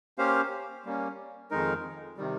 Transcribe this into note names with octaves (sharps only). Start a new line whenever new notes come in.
A#3 C#4 G4 C5 F5
G3 A#3 C#4
F2 D#3 G#3 D#4 A#4
C3 D#3 G3